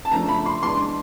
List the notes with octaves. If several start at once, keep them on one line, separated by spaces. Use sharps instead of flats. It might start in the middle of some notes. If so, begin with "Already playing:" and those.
A5
C#3 F3 A3 D4 A#5
B5
C6
E3 G#3 B3 D4 C6